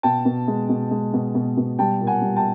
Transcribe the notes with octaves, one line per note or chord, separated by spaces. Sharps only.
B2 G5 A5
B2
G#3
B2
G#3
B2
B2
B2
G3 G5 A5
A#2
F#5 G#5
G3
G5 A5